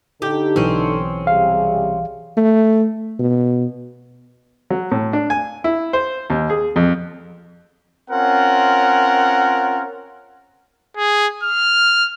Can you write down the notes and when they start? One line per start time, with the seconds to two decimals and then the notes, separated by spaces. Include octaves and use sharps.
0.22 D3 D#4 G4 A4
0.56 B1 E3 C4 C#4
1.27 C3 G3 G#4 F5
2.37 A3
3.19 B2
4.70 F#3
4.92 A2
5.13 D4
5.30 G#5
5.64 E4
5.93 C5
6.30 D#2
6.50 G#4
6.76 F2
8.10 C4 C#4 F4 A#4 F#5
10.97 G#4
11.43 F6